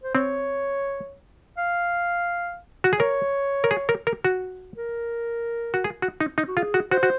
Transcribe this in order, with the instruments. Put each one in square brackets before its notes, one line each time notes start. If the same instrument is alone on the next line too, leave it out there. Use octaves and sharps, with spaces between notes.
[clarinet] C5
[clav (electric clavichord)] C4 [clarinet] C#5
[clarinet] F5
[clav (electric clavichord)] F#4
G#4
[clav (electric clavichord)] A#4 [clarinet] C#5
[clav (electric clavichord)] A#4
G#4
A#4
A#4
F#4
[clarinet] A#4
[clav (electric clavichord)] F#4
G#4
F#4
D#4
D#4
[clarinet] F#4
[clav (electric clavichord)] F4 [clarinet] G#4
[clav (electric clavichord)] F#4
[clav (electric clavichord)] F#4 [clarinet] C5
[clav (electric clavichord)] F#4